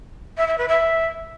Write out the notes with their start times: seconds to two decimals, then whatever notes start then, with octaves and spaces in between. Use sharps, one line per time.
0.37 E5
0.48 E5
0.58 B4
0.68 E5